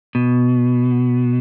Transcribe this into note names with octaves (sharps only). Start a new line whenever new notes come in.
B2